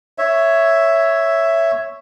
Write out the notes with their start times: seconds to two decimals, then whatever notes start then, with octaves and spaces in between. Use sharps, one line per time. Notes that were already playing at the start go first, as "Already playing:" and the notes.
0.18 C#5 E5